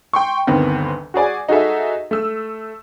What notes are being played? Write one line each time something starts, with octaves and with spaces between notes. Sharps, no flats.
G5 C6 C#6
G1 D2 D#3 B3 C4
F#4 G#4 D5 G#5
D#4 F#4 G#4 A4 E5
A3 E6